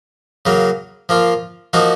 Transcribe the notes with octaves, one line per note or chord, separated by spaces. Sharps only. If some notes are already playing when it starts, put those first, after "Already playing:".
C#3 F#3 A#3
F3 A#3 F4
F3 A#3 D#4 F#4